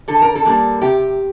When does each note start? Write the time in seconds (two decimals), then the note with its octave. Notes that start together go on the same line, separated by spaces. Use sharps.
0.08 D3 A4
0.22 A#4
0.35 A4
0.45 G3 A#3 D4
0.81 C3 G4